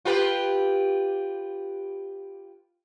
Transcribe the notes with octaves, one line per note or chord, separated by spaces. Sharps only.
F4 G4 B4